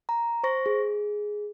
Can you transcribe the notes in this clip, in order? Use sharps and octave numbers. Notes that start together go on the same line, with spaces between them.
A#5
C5 C#6 A#6
G#4